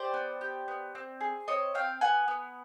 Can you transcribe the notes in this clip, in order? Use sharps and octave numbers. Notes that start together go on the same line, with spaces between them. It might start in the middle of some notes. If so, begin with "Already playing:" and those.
Already playing: G4 C5 D5
B3
G4
B3
C4
G#4
C4 C#5 D#5
C4 F5 G5
B3 F#5 G#5
B3